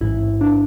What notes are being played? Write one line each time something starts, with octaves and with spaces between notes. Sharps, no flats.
A1 G#2 E3 E4
D4